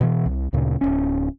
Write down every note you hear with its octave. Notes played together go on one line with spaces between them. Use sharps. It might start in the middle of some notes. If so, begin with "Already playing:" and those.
B2 E3
C2
D2 A#2 C#3
D1 G#1 C#4